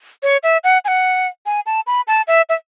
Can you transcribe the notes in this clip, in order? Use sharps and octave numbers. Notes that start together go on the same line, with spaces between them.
C#5
E5
F#5
G#5
F#5
G#5
A5
B5
A5
E5
E5